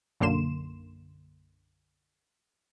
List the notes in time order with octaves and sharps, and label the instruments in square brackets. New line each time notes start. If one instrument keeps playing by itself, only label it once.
[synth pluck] B1 F#2 D3 A#3 C6 E7